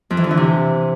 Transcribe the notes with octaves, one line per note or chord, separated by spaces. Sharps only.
F2
E3
D3
E3
C3